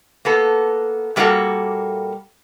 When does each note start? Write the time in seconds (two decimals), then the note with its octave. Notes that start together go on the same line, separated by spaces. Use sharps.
0.25 A#3 B3 A4
1.16 A#2 G3 A3 A#3 F#4 A4